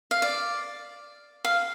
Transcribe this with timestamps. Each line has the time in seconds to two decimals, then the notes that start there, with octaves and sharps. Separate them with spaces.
0.11 F5
0.22 D5
1.45 F5